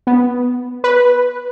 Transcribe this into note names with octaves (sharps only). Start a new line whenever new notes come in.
B3
B4